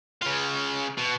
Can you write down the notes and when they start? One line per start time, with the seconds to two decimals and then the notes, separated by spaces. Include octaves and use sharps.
0.22 C#3 F4
0.97 B2